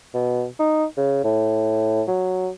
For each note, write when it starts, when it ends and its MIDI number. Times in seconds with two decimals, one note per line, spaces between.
0.14 0.46 47
0.59 0.85 63
0.97 1.23 49
1.24 2.03 45
2.07 2.49 54